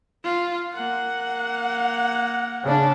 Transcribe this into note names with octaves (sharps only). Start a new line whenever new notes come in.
F4
A#3 F#5
C#3 D4